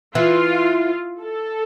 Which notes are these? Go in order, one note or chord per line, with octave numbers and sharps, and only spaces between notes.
E3 F4
A4